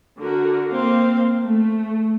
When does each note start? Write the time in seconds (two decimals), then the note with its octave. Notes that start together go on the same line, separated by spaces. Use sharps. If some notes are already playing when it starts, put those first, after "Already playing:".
0.20 D3 F#4 A#4
0.71 A#3 C4 F5
1.43 A3